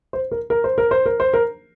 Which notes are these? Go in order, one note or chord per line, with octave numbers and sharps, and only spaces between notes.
C5
A#4
A#4
C5
A#4
C5
A#4
C5
A#4